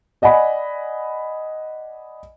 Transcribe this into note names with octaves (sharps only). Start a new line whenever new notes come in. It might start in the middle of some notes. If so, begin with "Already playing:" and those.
D5 D#5 F#5 G#5 B5